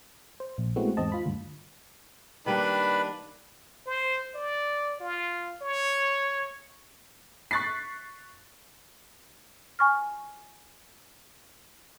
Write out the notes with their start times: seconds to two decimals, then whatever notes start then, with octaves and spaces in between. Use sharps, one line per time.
0.40 C5
0.58 A#1
0.76 G#3 A3 B3 C4 E4 F#4
0.97 E2 G#2 C4 D#5 A5
1.12 F4 B5
1.26 D2 G2
2.46 D#3 G3 A#3 D4 B4 B5
3.87 C5
4.35 D5
5.00 F4
5.62 C#5
7.51 C#6 F#6 A6 B6 C7
9.79 G#5 C#6 F6